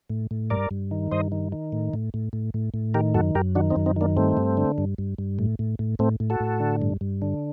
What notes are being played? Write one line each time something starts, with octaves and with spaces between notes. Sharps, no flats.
A2
A2
G2 A#4 D5
G2
D#3
G2 C5 D#5
D#3
D#3
A2
A2
A2
A2
A2
A2
D#3 G4 A#4
F#2 F#4 A4
F#2 G4 A#4
D#3 D4 F#4
C4 D#4
F#2
C4 D#4
D#3 A#3 D4
G2 A3 C4
G2
D3
G2
G2
G2
A2
A2
A2
A2 A3 C4
A2
F#4 A4
A2
D3
G2
G2
D3